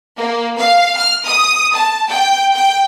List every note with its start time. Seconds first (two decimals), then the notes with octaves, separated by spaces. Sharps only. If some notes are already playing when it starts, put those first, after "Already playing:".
0.17 A#3
0.57 F5
0.97 F6
1.26 D#6
1.74 A5
2.09 G5
2.54 G5